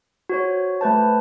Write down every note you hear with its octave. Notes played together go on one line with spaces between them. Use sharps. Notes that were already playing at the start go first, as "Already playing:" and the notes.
F#4 C5 C#5
A3 B4 C5 A5